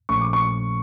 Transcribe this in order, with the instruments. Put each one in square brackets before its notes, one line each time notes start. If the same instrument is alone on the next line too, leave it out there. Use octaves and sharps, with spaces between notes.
[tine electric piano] A#1 A#2 F3 A3 C#4 [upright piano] C#6
[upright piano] D6
C#6